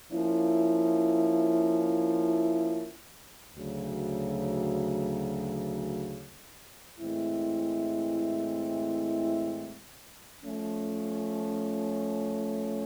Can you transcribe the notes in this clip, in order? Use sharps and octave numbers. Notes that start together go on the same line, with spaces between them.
F3 A#3 C#4 E4
D2 C#3 F#3
A2 E3 G#3 C4 E4
F3 A3 C#4